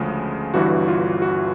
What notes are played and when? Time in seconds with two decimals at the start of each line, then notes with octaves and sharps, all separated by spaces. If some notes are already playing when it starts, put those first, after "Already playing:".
Already playing: D2 C#3 F3 G#3
0.54 G1 G2 E3 F#4
0.88 F4
1.22 F#4